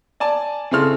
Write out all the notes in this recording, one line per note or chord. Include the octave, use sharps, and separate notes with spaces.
D5 G#5 A5
C#3 C4 E4 A4 C6 F6